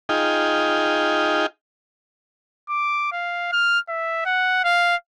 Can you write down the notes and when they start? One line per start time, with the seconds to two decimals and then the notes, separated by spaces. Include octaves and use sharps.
0.09 D#4 F4 G#4 G5
2.69 D6
3.12 F5
3.52 F6
3.89 E5
4.25 F#5
4.64 F5